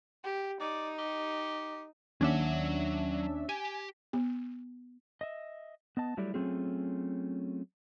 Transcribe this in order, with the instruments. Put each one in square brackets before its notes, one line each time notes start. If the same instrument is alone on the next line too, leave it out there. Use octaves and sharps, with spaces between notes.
[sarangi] G4
[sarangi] D#4 [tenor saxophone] D5
[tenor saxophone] G4
[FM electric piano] D#2 [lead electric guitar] F#3 F#5 [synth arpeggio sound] C#4 D4 E5
[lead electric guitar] G4 [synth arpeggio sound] G#5
[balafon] B3
[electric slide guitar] D#5 E5
B3 D#5 A5
F#3 G3 A3 E4 G4 D5
F#3 A3 C4 C#4 F4 G#4